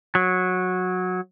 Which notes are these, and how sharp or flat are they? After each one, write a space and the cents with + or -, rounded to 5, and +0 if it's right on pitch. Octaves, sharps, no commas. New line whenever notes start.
F#3 -15